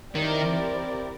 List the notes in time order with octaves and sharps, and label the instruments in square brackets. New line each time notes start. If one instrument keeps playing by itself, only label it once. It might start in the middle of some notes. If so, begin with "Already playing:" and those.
[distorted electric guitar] D#3 [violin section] C4 E4 G4 A#4 D5